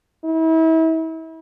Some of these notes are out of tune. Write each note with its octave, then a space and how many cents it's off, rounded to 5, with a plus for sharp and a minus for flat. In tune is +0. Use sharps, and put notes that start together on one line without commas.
E4 -35